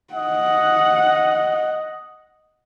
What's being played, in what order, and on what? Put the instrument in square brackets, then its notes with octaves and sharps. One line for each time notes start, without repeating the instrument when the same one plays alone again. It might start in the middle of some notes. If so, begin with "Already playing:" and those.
[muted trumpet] D#5 [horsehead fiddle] F#5